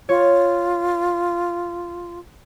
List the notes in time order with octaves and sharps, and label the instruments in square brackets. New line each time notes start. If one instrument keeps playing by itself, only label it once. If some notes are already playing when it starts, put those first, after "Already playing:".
[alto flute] F4 [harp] C#5